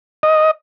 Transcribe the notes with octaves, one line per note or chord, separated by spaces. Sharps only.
D#5